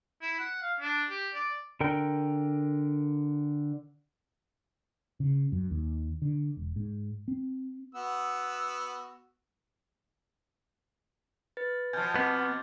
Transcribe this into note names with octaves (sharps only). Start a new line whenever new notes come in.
E4
F#5
F5
D4
G4
D5
D3 A#4 G5
C#3
F#2
D#2
D3
E1
G#2
C4
B3 F#4 E6
B4 A6
B2 F3 G#5 A5 F6 G6 G#6
B3 C4 D6